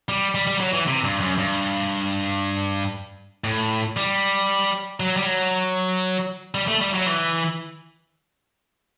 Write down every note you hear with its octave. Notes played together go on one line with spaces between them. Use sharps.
G3
G3
G3
F#3
E3
C3
G2
F#2
G2
A2
G3
F#3
G3
F#3
G3
A3
G3
F#3
E3